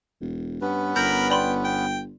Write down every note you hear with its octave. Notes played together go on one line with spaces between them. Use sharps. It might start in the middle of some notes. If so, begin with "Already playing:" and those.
E1
G2 B3 C#4 B4
G1 A#4 B5 G6
D5 G5 B5 C6
G5